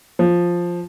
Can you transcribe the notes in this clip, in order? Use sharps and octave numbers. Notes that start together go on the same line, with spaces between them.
F3